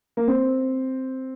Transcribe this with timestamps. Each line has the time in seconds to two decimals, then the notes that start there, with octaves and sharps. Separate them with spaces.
0.17 A#3
0.28 C4